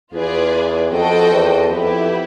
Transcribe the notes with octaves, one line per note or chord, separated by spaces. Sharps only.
E2 F4 G#4 B4 D5
F2 F#4 A4 C5 D#5 G5
E2
F2 B3 E4 G4